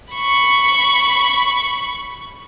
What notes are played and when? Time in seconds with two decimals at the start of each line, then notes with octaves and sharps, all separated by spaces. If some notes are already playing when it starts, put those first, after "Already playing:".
0.13 B5 C#6